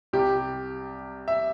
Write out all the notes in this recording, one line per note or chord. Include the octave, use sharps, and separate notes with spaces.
C2 C3 G3 G4
E5